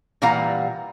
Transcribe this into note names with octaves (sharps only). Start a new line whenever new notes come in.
A#2 E3 G3 F5 F#5 A#5